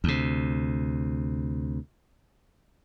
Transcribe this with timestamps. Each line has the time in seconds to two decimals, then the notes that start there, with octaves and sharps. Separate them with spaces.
0.04 D2 C3